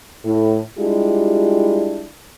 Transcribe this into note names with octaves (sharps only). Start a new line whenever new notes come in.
A2
G3 G#3 D4 E4 F4 G4